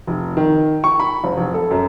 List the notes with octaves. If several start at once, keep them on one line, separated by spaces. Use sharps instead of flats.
F1
D#3
C#6
B5
F#1
F1
A4
F#2